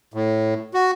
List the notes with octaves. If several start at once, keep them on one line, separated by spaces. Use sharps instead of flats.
A2
F#4